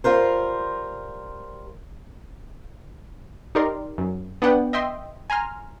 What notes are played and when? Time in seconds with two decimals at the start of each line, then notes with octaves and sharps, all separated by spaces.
0.04 G3 F4 A#4 C5
3.55 D#4 G4 A#4 D5 C6
3.98 F#2
4.42 B3 D4 F#5 G5
4.73 D#5 E5 G5 C6
5.30 G#5 A#5 C6 F6